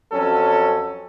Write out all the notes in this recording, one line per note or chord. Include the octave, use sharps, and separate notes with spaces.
F2 F#3 C#4 A4